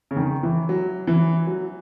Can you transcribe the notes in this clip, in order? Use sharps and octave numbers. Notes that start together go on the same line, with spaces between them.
C#3
D#3
E3
F#3
E3
F#3